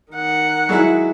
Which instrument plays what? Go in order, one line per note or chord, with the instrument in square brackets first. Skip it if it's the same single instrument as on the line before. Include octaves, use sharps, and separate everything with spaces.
[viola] D#3 F#5
[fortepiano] F#3 G#3 E4